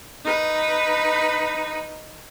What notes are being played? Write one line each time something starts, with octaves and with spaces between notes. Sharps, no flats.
D#4 B4